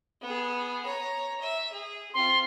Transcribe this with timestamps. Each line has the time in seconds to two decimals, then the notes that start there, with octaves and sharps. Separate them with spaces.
0.21 B3 G#4
0.86 C#5 A#5
1.41 E5
1.72 G#4
2.14 C4 F4 C6